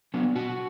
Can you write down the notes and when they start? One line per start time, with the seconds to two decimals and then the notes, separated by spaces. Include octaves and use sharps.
0.14 F#3 B3 D4
0.35 B2 F#4